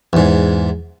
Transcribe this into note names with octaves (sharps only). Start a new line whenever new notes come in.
E2 G#2